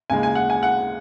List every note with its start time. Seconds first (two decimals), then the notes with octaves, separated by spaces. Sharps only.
0.10 D#2 C#3 G#3 G#5
0.23 G#5
0.35 F#5
0.50 G#5
0.63 F#5